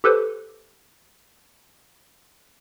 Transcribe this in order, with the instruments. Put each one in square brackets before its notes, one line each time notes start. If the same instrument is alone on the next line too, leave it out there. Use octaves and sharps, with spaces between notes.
[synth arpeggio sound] G4 A4 B4 C5 D6